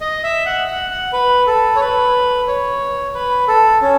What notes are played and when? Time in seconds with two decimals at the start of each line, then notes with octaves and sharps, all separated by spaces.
0.01 D#5
0.24 E5
0.46 F#5
0.68 F#5
0.91 F#5
1.13 B4
1.47 A4
1.76 C#5
1.81 B4
2.47 C#5
3.14 B4
3.48 A4
3.81 C#4